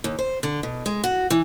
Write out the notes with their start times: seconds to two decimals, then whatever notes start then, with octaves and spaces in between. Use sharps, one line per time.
0.04 D#2
0.19 C5
0.43 D3
0.63 B2
0.86 G#3
1.04 F#4
1.30 E3